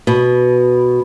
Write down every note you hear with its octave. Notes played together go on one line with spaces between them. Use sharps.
B2